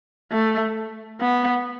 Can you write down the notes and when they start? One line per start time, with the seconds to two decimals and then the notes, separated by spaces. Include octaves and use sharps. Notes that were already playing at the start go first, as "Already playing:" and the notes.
0.32 A3
1.21 B3